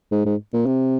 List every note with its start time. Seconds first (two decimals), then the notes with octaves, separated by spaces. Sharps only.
0.11 G#2
0.25 G#2
0.53 A#2
0.66 C3